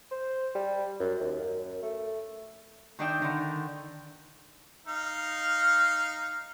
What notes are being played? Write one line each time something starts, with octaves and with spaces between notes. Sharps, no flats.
C5
G3
F#2
D#2
F#2
A3
D#3 D4 D#4 D5 E5 G5
D3 D#3
D#4 F5